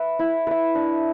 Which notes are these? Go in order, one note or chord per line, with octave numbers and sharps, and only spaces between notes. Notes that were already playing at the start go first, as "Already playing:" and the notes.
Already playing: B4 E5
E4
B4 E5
D4